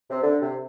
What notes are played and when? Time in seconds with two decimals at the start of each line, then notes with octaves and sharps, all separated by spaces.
0.10 C3
0.22 D3
0.41 C3